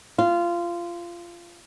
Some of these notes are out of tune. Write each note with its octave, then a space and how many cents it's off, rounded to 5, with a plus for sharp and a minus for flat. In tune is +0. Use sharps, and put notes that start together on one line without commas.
F4 -20